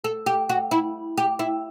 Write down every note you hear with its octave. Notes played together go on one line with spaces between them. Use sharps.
A4
G4
F#4
E4
G4
E4